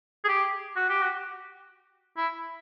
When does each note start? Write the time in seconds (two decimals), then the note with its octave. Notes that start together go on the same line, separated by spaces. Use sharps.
0.25 G#4
0.28 G4
0.76 F#4
0.89 G4
1.02 F#4
2.17 E4